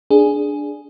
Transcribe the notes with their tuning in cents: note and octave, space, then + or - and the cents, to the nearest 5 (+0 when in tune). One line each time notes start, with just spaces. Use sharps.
D4 +0 G#4 +0